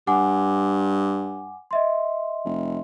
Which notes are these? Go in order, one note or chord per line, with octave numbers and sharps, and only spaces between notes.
G2 F#5 G#5 D6
D#5 E5 C6
F1